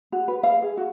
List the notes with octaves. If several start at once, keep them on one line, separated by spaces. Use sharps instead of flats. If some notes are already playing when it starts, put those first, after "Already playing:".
F#4
B4
F5
G#4
F#4